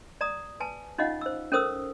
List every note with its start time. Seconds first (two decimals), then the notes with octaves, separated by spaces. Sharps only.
0.21 D5 A#5 D#6
0.60 B4 G#5 A5
0.98 C#4 D#4 F4 D#5 F5 F#5
1.21 C5 E6
1.52 C#4 A4 A#4 C5 D#6 E6